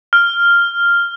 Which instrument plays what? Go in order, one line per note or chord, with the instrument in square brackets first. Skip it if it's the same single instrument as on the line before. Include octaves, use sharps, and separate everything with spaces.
[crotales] F6